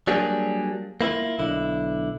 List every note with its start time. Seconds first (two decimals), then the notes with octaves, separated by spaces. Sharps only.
0.07 F#3 G3 A#3 D4 G#4
1.01 A#3 E4 F4
1.39 B1 D3 E4